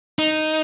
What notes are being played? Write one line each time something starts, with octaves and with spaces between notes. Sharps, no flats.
D#4